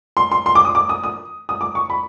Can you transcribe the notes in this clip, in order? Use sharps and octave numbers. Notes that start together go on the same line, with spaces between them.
C6
C6
C6
D6
D#6
D6
D#6
D#6
D#6
D6
C#6
B5